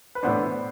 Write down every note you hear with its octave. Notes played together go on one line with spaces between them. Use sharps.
B4
A2 E3 B3 D4 C5